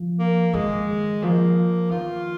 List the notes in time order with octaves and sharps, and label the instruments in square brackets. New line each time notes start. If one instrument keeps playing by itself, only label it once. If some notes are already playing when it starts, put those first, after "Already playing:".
Already playing: [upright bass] F3
[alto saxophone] A#3
[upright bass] D#3 [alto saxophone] G#3
[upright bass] F3 [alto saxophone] A#3
[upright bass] D#3 [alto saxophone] F4